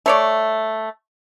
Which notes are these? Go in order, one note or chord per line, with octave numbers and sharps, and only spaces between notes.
A3 C#5 D5